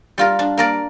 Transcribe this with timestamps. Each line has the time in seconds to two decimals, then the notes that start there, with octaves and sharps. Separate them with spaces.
0.18 G3 F4 A#4
0.39 D4
0.58 A#3 A#4 D5